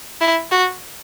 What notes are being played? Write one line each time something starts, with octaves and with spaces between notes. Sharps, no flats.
E4
F#4